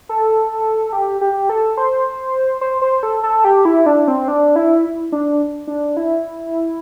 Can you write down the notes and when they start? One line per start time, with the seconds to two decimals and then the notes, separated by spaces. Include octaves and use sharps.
0.09 A4
0.93 G4
1.21 G4
1.49 A4
1.77 C5
2.61 C5
2.82 C5
3.03 A4
3.23 A4
3.45 G4
3.65 E4
3.86 D4
4.08 C4
4.28 D4
4.56 E4
5.12 D4
5.68 D4
5.97 E4